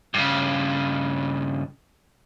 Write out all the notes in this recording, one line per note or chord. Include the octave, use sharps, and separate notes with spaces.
G2 C#3